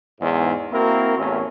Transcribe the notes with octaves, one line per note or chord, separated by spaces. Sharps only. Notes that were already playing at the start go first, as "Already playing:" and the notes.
E2 G#2
A#3 C4 E4 F#4 A#4
A1 E2 A2 C#4